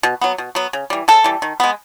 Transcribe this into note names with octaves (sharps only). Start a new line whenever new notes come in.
B2
F#3 B3
B2
F#3 B3
C#3
E3 G3
C#3 A4
E3 G3
D#3
G#3 B3